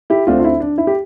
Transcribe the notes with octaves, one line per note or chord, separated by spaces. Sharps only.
E4 G4
D2 D3 A3 C4 D4 F4
F4
E4
D4
E4
G4